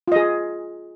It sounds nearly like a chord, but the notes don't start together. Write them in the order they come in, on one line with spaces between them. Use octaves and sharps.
F4 D#5 G#4